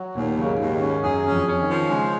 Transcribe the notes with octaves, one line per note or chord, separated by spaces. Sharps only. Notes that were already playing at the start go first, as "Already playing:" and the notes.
Already playing: F#3
D#2 A#2 A#3
C#3 F#3
G#2 G#3
D#2
G#2 G#3
C#4
F#2 F#3 G#4
C#4
F2 F3
C#4
D#3
F3
C#3 G#3